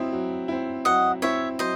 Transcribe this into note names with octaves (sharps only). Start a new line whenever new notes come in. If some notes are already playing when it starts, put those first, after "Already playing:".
Already playing: F#3 C4 E4 D#5
F#3
C4 E4
F#3 D#5 F#5
C4 E4 C#5 E5
F#3 C5 D#5